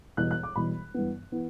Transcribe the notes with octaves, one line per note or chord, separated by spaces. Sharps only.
E1 E2 B2 G3 F#6
F#6
D6
E1 E2 B2 G3 B5
G2 E3 B3
E3 B3